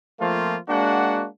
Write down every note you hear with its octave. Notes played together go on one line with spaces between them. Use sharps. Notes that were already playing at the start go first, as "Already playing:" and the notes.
F3 A3 A#3 C4 F4
G#3 A#3 D4 F#4 F#5